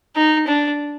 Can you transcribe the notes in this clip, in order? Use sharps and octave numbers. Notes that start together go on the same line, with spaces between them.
D#4
D4